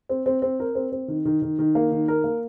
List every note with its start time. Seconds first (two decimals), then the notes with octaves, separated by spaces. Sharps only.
0.09 C4
0.26 C4
0.42 C4
0.60 A#4
0.75 C4
0.92 C4
1.08 D#3
1.25 D#3
1.42 D#3
1.59 D#3
1.75 A#3
1.91 D#3
2.08 A#4
2.24 A#3